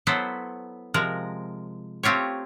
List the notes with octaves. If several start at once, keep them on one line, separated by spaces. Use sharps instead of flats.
F#3 B3 E4 A4 C5
C3 F3 G#3 A#4
A3 C4 F4 G4 C#5